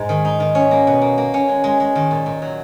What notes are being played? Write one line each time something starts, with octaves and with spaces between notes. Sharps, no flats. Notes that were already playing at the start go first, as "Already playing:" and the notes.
Already playing: G#2 G#3
D#3
D#4
D#3
C#4
A#3
B2
A#3
A#3
C#4
G#3
G#3
G#3
D#3
A#2
A#2
F#3